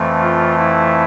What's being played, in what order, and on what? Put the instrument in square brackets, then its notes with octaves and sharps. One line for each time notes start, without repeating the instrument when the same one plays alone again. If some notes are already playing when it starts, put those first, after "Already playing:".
Already playing: [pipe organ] F2 E3 A3
F4
E4